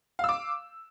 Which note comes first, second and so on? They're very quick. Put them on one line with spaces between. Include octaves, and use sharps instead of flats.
F5 E6 D6